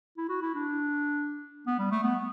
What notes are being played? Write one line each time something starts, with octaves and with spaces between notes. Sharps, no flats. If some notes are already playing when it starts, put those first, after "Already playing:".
E4
F#4
E4
D4
B3
G3
A3
B3